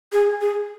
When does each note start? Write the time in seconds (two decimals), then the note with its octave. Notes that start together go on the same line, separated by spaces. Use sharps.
0.12 G#4
0.41 G#4